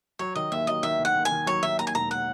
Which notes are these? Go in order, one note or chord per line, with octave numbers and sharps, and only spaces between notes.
F#3 C#5
D#3 D#5
D#2 E5
F#3 D#5
D#3 E5
D#3
F#5
D#2
G#5
D#3
F#3 C#5
D#3 E5
D#2 A#5
G#5
E1 A#5
F#5